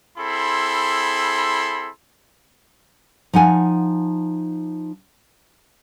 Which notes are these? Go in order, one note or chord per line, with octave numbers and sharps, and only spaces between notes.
C4 E4 G#4 A4 B5 C6
F3 D#4 F#5 G#5